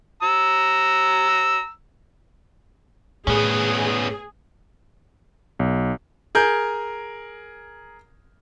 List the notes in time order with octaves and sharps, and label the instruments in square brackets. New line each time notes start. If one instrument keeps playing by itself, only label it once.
[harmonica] A#5 E6
[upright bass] A2 [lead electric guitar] B3 C#4 [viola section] G#4
[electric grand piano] B1
[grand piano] G#4 A#4 G6